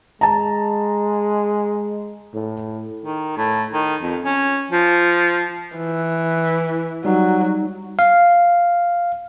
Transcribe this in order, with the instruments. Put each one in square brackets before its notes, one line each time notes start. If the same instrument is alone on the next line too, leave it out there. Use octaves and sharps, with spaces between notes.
[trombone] G#3 [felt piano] A5 A#5
[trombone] A2
[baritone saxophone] D#3
A2
D#3
F2
C#4
F3
[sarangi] E3
[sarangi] F#3 [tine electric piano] G3 D#4
[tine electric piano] F5